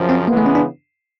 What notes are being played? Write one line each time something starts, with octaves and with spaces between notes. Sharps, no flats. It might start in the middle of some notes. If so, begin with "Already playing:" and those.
Already playing: F#2 C#3 F3
C4
C#3 E3 G#3 A#3 B3
A3
C#4
D4